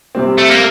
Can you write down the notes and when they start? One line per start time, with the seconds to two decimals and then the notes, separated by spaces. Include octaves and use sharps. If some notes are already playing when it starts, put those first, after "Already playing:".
0.15 C3 G3 C4
0.38 A3
0.51 A#3